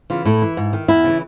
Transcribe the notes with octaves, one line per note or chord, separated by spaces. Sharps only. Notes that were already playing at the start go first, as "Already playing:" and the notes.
C#3 E3 F4
A2 E4
E3
G#2
D#3
E2 E4
C#3 E3